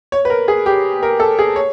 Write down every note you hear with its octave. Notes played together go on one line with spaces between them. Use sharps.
C#5
B4
A#4
G#4
G4
A#4
A4
G#4
C#5